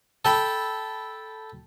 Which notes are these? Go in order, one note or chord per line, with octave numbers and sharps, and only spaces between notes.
A4 G5 B5